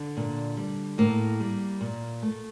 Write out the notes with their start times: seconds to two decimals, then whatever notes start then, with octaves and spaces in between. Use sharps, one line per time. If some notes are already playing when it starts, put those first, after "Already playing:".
Already playing: D3 D4
0.17 A#2
0.57 G3
0.98 A2 A#3
1.40 G3
1.81 A#2
2.22 A3